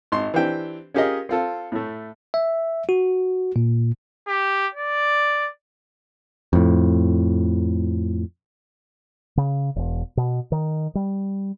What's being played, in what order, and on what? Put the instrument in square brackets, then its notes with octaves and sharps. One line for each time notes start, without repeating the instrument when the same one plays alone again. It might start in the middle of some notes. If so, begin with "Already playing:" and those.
[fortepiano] G#1 C6
E3 C4 D4 G4 G5
C#4 F4 G4 G#4 A#4 D#5
C4 F4 A4
A2 A3
[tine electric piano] E5
F#4
A#2
[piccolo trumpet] G4
D5
[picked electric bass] F2 A2
[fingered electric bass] C#3
E1
B2
D#3
G3